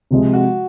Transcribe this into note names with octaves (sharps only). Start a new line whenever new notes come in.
C3 F3 G#3
F#4